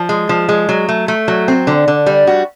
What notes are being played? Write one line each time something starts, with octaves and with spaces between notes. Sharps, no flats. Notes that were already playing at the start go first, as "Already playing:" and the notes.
Already playing: F3
G#3
F3
G#3
F#3
A3
A3
F#3
C4
D3
D3
G3
F#4